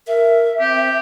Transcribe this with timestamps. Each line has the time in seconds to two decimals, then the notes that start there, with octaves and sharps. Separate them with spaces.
0.07 A#4 E5
0.60 C4 G4